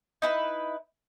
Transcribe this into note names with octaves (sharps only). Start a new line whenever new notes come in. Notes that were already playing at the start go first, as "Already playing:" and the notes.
D#4 E4 B4